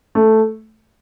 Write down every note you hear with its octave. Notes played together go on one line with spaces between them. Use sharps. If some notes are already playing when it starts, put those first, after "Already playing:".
A3